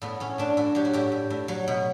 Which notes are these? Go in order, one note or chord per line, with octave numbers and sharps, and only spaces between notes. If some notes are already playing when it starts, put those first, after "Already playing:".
A2 B3
A2 C#4
A2 D4
A2 F#4
F#3 G4
F#4
A2 G4
A2
A2
F#3
B2